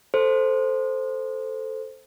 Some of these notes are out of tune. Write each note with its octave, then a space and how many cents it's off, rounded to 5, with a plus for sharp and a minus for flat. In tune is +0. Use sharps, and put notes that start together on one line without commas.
A4 +0 C5 +0